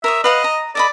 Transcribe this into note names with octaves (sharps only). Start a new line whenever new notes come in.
A#4 C#5 E5 D#6
B4 D#5 F5 F#5
A#5
A4 D5 D#5 B5